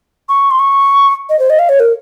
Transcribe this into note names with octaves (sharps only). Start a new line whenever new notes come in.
C#6
C6
C#6
D#5
C5
D#5
F5
C#5
A#4